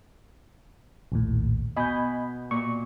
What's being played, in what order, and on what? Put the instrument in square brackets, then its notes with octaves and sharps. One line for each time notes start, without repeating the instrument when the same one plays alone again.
[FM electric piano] A#1 D#2 A2
[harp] B2 G6 [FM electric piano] D#5 G#5 B5
[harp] A#2 [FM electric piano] C#6